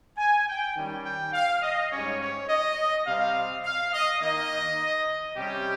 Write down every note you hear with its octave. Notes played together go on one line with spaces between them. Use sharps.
G#5
G5
D#3 G3 C#4
G5
F5
D#5
G#2 G3 C#4 C#5
C#5
D#5
C3 G3 C4 F5
F5
D#5
D#3 A#3 D#4 D#5
C3 G3 C#4 G4